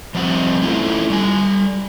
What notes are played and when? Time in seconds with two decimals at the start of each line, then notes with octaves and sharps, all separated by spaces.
0.14 F3 G3 C4 F#5
0.61 A3 C#4 E4 F4 A4
1.10 G3 G#5